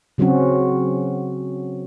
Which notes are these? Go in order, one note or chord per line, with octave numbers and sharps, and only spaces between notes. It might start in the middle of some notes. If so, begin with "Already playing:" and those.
C#3 F#3 C4 C#4 F#4